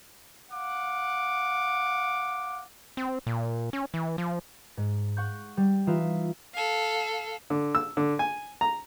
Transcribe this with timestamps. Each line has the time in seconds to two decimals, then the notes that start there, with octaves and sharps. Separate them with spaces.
0.51 F5 F#5 D6
2.97 C4
3.27 A#2
3.73 C#4
3.94 E3
4.18 F3
4.77 G#2
5.17 F#5 C#6 G6
5.57 G3
5.87 E3 D#4 F4 E5
6.54 A4 F5
7.50 D3
7.75 E6
7.97 D3
8.19 G#5
8.61 A#5